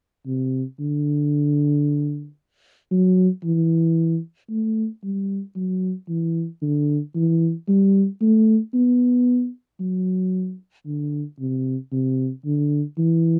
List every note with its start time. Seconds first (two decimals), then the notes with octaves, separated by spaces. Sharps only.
0.26 C3
0.79 D3
2.91 F#3
3.44 E3
4.50 A3
5.03 G3
5.56 F#3
6.08 E3
6.62 D3
7.15 E3
7.68 G3
8.21 A3
8.74 B3
9.80 F#3
10.86 D3
11.39 C3
11.92 C3
12.45 D3
12.98 E3